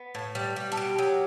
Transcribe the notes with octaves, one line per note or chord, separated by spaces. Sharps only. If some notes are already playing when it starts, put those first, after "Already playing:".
Already playing: B3
A2
G3
G3
A4
B2 G4
F#3